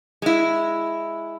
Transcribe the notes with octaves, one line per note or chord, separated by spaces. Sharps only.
G#3 E4